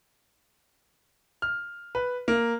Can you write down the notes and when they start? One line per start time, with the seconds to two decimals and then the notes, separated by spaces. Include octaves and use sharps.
1.42 F6
1.95 B4
2.28 A#3